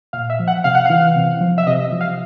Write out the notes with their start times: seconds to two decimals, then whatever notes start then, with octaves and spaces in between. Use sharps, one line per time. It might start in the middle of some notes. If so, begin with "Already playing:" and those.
0.13 A#2 F5
0.30 E5
0.39 F3
0.48 F#5
0.64 C3 F5
0.75 F#5
0.86 E3 F5
1.16 C3
1.41 F3
1.58 E5
1.67 C3 D#5
1.92 F3
2.01 F5